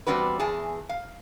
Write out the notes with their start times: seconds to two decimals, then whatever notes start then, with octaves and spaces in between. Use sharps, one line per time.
0.07 E2 G3 C4 D4 F#4 B4
0.40 E2 E3 G#4 A5
0.89 F5